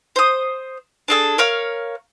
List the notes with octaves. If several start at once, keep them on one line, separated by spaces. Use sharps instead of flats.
C5 D#6
D4 G#4 A4
A#4 C#5 F5